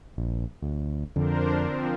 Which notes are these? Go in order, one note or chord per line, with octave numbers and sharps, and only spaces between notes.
A#1
D2
F2 D3 D4 A#4 C5
F3 C4